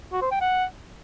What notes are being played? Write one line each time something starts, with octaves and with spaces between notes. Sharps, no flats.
F#4
C5
G5
F#5